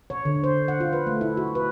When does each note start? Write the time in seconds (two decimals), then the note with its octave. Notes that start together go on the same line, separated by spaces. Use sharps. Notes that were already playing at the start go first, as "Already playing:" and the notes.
0.10 C#5
0.25 D3
0.44 C5
0.68 F#5
0.80 F4
0.93 B4
1.07 A3
1.21 E4
1.37 F#4
1.55 B4